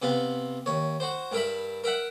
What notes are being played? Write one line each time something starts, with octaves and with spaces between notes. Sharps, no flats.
C3 B3 F4
D#2 C#5
F#4 C5
G2 A#4 E5 B5
A#4 E5 F#5